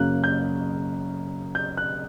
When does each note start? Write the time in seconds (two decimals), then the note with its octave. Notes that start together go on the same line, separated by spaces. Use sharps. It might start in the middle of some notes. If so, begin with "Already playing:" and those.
Already playing: F#2 C#3 F#3 A#3 F#6
0.24 G6
1.55 G6
1.77 F#6